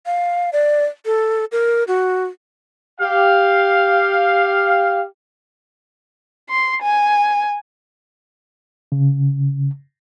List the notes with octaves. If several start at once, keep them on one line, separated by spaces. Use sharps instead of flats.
F5
D5
A4
A#4
F#4
G4 F5
C6
G#5
C#3